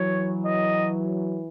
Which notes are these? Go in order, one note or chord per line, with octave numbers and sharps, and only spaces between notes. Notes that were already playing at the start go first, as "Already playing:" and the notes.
Already playing: E3 F#3 C#5
D#5